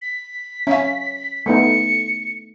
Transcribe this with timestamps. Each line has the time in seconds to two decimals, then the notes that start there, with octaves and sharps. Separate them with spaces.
0.02 B6
0.67 C#4 E5 F5
1.46 A3 B3 D#4 C#7